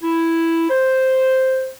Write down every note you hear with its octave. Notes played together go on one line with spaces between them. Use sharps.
E4
C5